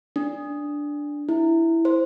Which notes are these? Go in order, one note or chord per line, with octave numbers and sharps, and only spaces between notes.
D4
E4
C5